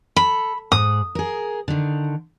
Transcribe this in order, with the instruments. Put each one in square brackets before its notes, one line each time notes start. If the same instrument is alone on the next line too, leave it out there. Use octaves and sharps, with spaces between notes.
[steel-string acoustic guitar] A4 [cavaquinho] B5
[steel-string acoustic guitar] G#2 [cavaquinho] D#6
[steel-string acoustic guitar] G#4 A#4
D3 D#3